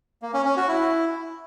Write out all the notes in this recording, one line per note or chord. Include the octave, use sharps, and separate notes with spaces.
A#3
C#4
C#4
F#4
E4